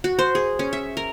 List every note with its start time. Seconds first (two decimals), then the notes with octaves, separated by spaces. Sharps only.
0.04 F#4
0.19 C5
0.35 G#4
0.59 C#4
0.73 E5
0.97 A#4